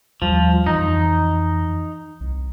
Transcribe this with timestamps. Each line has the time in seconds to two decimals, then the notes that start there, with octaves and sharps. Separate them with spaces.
0.22 D#2 F3 G3
0.66 F2 E3 D#4
2.21 C2